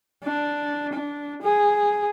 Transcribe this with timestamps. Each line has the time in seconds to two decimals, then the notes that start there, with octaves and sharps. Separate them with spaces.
0.24 D4
0.94 D4
1.43 G#4